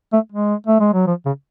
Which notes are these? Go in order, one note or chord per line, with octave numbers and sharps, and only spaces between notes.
A3
G#3
A3
G#3
F#3
F3
C#3